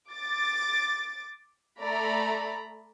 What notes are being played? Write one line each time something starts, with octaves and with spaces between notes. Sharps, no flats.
D6 A6
A3 D5 A#5 B5